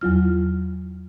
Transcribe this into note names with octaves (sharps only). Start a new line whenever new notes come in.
E2 F#3 F4 F6